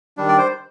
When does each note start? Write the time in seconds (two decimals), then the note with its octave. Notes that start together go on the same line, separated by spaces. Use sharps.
0.17 D#3 G3 D4
0.28 D5
0.38 C5